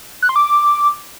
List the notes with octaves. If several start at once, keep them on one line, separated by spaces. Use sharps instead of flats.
F#6
C6
D6